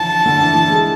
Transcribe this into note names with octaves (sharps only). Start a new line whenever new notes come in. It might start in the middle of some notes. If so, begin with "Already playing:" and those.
Already playing: D3 E3 F3 A5
D3
E3
E3
G#3